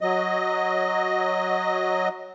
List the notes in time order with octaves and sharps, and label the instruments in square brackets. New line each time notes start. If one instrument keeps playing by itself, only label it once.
[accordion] F#3 D#5